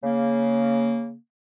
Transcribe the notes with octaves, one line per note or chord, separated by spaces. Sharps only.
C#3 A#3